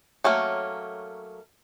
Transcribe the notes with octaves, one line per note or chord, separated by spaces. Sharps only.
F#3 A3 A#3 C#4